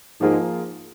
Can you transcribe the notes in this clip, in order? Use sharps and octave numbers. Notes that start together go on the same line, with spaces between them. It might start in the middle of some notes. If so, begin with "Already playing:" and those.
G#2 F3 A#3 F4 G#4